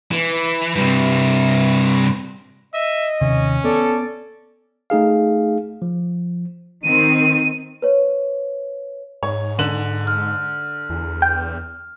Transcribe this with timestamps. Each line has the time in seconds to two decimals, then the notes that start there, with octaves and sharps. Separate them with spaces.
0.11 E3
0.76 G2 C3
2.74 D#5 E5
3.21 D#2 C3 D#3 C#4
3.65 B3 A4 D5
4.90 A3 D#4 G#4 F5
5.82 F3
6.83 D#3 C4 D#7
7.82 B4 C#5
9.23 G#2 C#5
9.59 D3 E7 F#7
10.07 F6
10.90 E2
11.22 G5